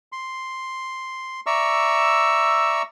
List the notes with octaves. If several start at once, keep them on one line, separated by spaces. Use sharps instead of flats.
C6
D5 E5 A#5 C#6 E6